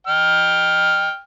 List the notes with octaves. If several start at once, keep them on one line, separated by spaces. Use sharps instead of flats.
G5 F6